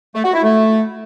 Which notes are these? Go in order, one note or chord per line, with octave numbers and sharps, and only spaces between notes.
A3
F#4
E4
A3